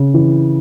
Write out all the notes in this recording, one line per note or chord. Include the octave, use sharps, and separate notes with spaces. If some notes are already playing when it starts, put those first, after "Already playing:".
Already playing: C#3
E3